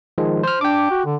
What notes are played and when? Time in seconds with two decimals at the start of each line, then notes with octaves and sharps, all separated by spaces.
0.18 D#3 F3 G#3
0.43 C5 F6
0.61 D4 G5 D6
0.90 F#4
1.05 D3